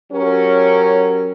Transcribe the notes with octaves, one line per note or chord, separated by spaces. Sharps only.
F#3 C#4 G4 A#4